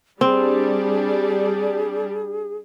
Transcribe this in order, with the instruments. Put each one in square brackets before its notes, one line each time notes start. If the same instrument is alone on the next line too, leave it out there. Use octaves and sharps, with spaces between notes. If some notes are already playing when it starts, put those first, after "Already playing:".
[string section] G3 D4 [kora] C4 [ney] G#4